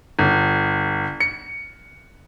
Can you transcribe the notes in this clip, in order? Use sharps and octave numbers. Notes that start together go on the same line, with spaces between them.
G1
C#7